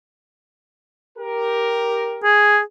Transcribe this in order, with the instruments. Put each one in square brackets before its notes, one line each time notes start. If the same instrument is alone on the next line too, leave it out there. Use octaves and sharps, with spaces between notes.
[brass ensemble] G4 A#4
[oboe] G#4